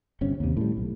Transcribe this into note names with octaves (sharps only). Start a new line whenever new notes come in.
G1 C3 C#4
D#2 C3
A2 G3
B1